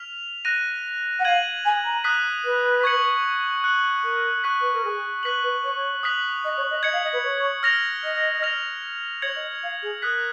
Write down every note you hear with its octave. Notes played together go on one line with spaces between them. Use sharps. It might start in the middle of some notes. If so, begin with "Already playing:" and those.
Already playing: F6 B6 F7
F#6 A#6 D#7
F#5
F5 G#6 D#7 F#7
G#5
A#5
D#6 F#6 B6
B4
C#6 G#6 C#7 F#7
F#6 C#7 F#7
A#4
C#6 F#6 B6
B4
A#4
G#4
B4 F#6 B6 F#7
B4
C#5
D#6 F#6 B6 F#7
D#5
C#5
D#5
D#5 G#6 C#7 F#7
F5
D#5
B4
C#5
F6 A#6 F7
D#5
F6 A#6 F7
C#5 G#6 C#7 F#7
D#5
F5
G#4
A#4 D#6 F#6 B6